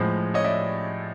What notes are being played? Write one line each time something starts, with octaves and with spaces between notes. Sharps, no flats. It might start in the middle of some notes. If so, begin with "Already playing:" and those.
Already playing: A2 F3 G#3
C#5 D#5
D5 E5